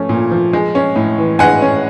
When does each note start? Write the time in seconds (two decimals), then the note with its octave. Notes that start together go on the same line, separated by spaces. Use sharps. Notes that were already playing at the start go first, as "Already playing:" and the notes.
Already playing: F3 A3 C#4
0.09 A#2
0.31 F3
0.53 G#3
0.75 C#4
0.96 A2
1.18 E3
1.39 G#3 F#5 G#5
1.62 C#4